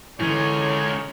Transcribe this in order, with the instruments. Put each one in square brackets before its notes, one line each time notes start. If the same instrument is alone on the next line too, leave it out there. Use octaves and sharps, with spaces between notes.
[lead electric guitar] C#2 C#4 [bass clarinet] D3 [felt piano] E3 [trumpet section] D#4 G#4 C#5